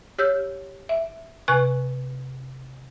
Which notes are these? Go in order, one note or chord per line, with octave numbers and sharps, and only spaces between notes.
G4 C#5 E6 F6 G6
E5
C3 B4 G#5 C#6 F#6